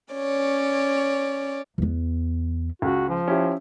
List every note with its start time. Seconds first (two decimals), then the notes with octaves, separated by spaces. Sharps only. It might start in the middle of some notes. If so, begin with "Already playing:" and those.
0.14 C#4 C#5 D5
1.78 E2 B3
2.82 C#2 F#4
3.09 F3
3.28 C#4 E4 G4